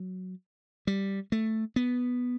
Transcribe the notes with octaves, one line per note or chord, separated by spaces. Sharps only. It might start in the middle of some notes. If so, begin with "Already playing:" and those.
Already playing: F#3
G3
A3
B3